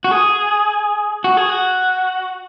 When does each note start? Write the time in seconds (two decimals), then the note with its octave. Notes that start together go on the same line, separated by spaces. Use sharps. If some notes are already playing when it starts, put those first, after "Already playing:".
0.04 F#4
0.11 G#4
1.24 F#4
1.37 G#4
1.49 F#4